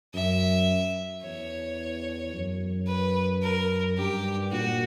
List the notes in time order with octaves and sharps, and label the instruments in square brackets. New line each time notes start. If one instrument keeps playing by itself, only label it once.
[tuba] F#2 [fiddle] E5
[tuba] E2 [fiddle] C#5
[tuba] F#2
[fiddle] B4
A#4
[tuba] G2 [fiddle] G4
[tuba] A#2 [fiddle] F#4